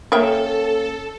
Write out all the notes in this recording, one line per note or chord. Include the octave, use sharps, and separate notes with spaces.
A#3 C#4 A4 A#4 E5 G5